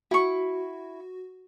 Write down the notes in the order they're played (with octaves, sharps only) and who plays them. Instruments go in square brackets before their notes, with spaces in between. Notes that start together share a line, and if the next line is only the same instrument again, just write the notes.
[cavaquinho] E4 C#6 [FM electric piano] F#4